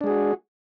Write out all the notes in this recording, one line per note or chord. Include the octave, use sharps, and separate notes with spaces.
G#3 D4 F#4 G#4